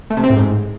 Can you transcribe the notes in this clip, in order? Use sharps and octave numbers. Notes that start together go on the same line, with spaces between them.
A3
C3
C4
A2
G#2